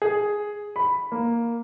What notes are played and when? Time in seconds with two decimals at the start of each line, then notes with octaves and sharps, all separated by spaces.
0.02 G#4
0.76 B5
1.12 A#3